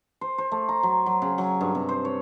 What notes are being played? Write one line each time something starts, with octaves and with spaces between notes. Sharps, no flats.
C5
C5
A3
A#5
F#3
F#3
C#3
F#3
G2
C3
C5
C#5